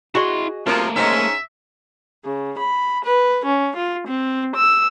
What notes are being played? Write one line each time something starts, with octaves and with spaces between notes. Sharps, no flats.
E4 F#4 G#4 D#5 C6
F#2 C3 F3 A3 A#3 F4 A#4 C5
G#2 C#4 D#4 C5 D#5 E5
C#3
B5
B4
C#4
F4
C4
E6